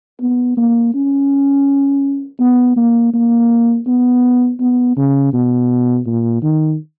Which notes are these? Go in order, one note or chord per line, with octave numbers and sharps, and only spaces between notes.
B3
A#3
C#4
B3
A#3
A#3
B3
B3
C#3
B2
A#2
D#3